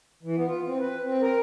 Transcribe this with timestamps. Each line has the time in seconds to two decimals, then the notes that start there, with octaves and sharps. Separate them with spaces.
0.23 E3
0.36 B3
0.48 F4
0.66 C4
0.80 B4
1.04 C4
1.22 A#4